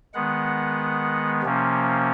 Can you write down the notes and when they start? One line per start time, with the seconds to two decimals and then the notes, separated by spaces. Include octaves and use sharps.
0.14 D#3 G#3 B3 F#5
1.43 C3 F3 A#3 C#4